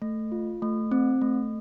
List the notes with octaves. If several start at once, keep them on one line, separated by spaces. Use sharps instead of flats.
A3
F4
A3
C4
A3